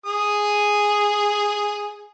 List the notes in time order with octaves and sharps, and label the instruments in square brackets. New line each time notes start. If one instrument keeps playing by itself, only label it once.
[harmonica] G#4 D#6